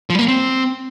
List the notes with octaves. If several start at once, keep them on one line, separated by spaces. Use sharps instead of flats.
F3
G3
A#3
C4